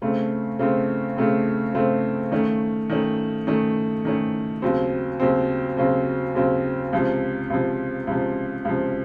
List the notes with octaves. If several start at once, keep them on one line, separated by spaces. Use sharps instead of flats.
C#3 A3 C4
C#3 A3 C4
C#3 A3 C4
C#3 A3 C4
D#3 A3 C#4
D#3 A3 C#4
D#3 A3 C#4
D#3 A3 C#4
D#2 C#3 F#3 C4
D#2 C#3 F#3 C4
D#2 C#3 F#3 C4
D#2 C#3 F#3 C4
C#2 C3 F3
C#2 C3 F3
C#2 C3 F3
C#2 C3 F3